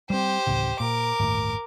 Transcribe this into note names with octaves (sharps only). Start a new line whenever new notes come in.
G3 C4 G4 C5
D1 A1 C#3
A#2 A#4 D6
G1 D#2 A2